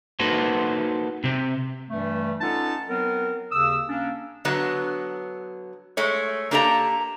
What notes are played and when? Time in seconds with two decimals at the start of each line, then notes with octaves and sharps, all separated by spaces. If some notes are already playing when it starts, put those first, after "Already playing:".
0.19 A#3 D#4 F#4 A4 B4 C5
1.24 C3 C4
1.89 G2 E3 G3 A3
2.40 C#4 D#4 F4 A4 F#5 A5
2.87 F#3 B3 C4 A#4
3.51 D#2 C#3 D#6 E6
3.87 A#3 C#4 D4
4.45 D3 F#3 B3
5.97 G#3 A3 C#5
6.51 A#3 D4 G4 A4 C#5 A#5